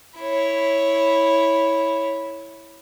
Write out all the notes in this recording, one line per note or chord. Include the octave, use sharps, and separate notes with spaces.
E4 C#5